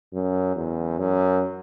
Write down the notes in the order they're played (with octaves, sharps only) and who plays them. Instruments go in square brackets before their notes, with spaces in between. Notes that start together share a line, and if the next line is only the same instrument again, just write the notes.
[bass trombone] F#2
E2
F#2